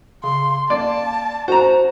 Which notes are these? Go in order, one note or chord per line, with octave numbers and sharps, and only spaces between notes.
C#3 C6
A#3 D5 A5
F#4 C5 A#5